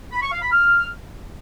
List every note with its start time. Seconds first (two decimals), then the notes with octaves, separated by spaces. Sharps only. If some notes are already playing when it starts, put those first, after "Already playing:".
0.12 B5
0.22 C#6
0.32 F5
0.42 B5
0.52 F6